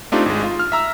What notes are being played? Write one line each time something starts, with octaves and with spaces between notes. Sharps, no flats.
A3 C4 D4 D#4 F4 G4
G#1 G#3
F4
F6
E5 A#5 E6